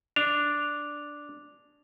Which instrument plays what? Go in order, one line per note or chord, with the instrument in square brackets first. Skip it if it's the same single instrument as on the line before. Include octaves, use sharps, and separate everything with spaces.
[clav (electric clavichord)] D4 [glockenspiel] F7